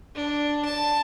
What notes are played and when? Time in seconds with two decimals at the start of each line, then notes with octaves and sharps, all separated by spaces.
0.15 D4
0.65 A5